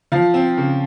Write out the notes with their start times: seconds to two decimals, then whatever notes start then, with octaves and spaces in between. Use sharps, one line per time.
0.12 F3 F5
0.34 C4
0.57 C#3